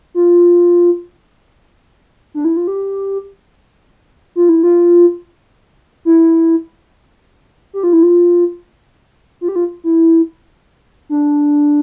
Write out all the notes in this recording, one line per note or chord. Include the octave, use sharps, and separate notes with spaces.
F4
D4
E4
F4
G4
F4
E4
F4
E4
G4
F4
E4
F4
F4
G4
F4
E4
D4